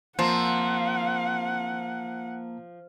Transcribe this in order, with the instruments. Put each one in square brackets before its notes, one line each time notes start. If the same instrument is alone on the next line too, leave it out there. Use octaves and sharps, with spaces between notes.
[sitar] F3 [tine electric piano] A#3 A5 A#5 [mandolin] C4 [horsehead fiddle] F#5